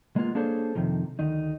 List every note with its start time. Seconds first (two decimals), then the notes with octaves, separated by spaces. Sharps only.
0.16 G#3 A#3 B3 F4
0.35 A#3 D4 G#4 A4 C5 C#5
0.75 F2 C3 D#3 F3
1.19 D2 D#3 D#4